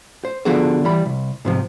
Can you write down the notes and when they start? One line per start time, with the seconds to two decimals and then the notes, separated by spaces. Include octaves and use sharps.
0.25 C5
0.45 D3 F3 B3 F#4 G#4 C5
0.84 E3 G3 B5
1.05 C2
1.45 G#2 C3 F3